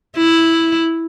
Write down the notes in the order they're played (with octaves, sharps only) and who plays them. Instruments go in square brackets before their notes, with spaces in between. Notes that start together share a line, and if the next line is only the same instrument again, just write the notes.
[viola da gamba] E4